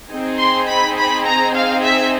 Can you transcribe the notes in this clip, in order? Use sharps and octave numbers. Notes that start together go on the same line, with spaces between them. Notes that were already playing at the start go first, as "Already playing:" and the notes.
C4 D#4 G#4
C6
B5
B5
A#5
F5
E5